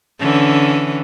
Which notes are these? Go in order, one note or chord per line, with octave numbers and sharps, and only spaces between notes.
D3 E3 C#4